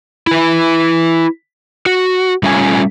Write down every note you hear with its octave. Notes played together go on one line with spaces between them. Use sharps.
E4 B4
F#4
G3 A3 C#4 F4 F#5 G#5